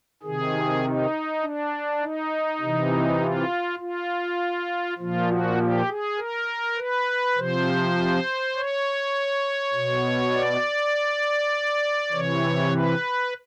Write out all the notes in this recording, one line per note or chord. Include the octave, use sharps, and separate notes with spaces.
C3 D#3 G#4
D#4
D4
D#4
C3 E3
F4
F4
A#2 F3 F4
F#4
G4
G#4
A#4
B4
C3 F3 C5
C#5
B2
D5
C3 E3 C#5
B4